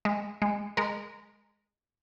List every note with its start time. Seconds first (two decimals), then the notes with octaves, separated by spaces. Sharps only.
0.05 G#3
0.42 G#3
0.77 G#3 A#4